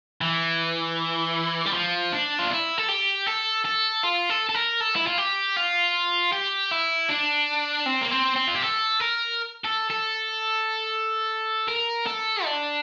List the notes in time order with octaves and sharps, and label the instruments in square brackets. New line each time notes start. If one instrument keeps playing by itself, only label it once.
[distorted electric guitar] E3
G3
F3
D4
F4
E4
A4
G4
A4
A4
F4
A4
A4
A#4
A4
E4
F4
G4
F4
G4
E4
D4
C4
A#3
C4
C4
F4
G4
A4
A#4
A4
A4
A#4
A4
D4